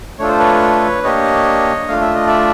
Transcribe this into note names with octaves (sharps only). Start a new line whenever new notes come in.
A3 D4 F4 A4 C#5
C5
B4 C#5
A#3 D4 G4 C#5 D#5
A3 D4 F4 F5
E5
D#5
D5 E5